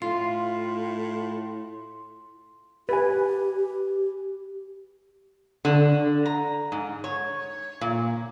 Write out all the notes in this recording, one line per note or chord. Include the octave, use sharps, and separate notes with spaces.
A2 F4 C6
G4 B4 G#5
D3
A#5
G#2
C#5
A#2